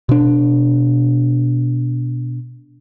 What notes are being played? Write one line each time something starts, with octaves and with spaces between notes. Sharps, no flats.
B2 D4